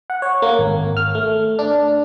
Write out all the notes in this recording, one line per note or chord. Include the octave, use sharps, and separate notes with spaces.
F#5
C#5
A#3
G#1
F6
A3
D4